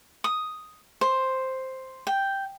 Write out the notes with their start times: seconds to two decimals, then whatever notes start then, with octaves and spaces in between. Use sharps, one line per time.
0.24 D#6
1.01 C5
2.07 G5